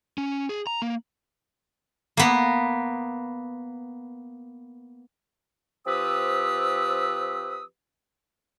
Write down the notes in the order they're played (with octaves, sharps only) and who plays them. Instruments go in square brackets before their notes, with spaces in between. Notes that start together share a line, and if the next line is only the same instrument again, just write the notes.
[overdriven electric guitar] C#4
G#4
A#5
A#3
[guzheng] A#3 B3
[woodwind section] F3 C4 G4 B4 D#6 E6